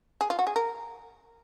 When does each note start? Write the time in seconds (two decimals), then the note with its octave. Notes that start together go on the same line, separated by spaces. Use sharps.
0.21 G#4
0.30 F4
0.39 F#4
0.47 G#4
0.56 A#4